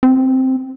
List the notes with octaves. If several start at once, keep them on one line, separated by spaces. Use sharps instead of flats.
C4